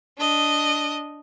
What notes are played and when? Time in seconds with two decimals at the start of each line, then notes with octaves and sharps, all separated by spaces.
0.18 D4 D#5